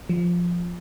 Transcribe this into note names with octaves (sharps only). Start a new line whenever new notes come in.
F3